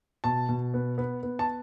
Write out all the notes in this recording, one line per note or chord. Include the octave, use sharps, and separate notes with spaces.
B2 A5
B2
B3
B3
B3
A5